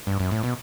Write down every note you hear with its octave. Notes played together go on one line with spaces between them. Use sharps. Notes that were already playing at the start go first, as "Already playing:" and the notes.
G2
F#2
A2
B2